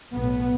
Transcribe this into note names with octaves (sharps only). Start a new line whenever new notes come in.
B1 A2 B3